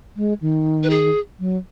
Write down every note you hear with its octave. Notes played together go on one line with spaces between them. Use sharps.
G#3
D#3
B4
G#4
F#3